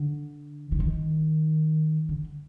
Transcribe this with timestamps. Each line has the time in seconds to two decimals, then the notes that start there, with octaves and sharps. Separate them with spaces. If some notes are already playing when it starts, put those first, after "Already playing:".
Already playing: D3
0.72 E3
0.80 D#3
2.09 D3